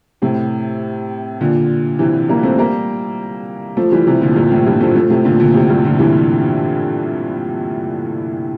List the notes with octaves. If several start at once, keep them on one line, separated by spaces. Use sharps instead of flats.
A2 C3
A#2 D3
C3 E3
G3 A#3
A3 C4
G3 A#3
F3 A3
E3 G3
C3 E3
A#2 D3
G2 A#2
A2
G2 A#2
F3 A3
F3 A3
A2 C3
A#2 D3
A#2 D3
A2 C3
G2 A#2
A#2 D3
C3 E3